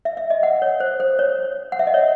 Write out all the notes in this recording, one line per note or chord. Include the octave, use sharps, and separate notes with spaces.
E5
E5
D#5
F#5
C#5
C5
C5
C#5
F#5
E5
D#5
C#5